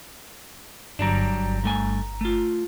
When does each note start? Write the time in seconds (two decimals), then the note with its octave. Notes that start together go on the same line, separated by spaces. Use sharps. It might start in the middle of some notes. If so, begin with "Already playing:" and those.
0.99 G1 F#3 G3 D4 A#5
1.64 G2 A3 G#5
2.21 A3 F4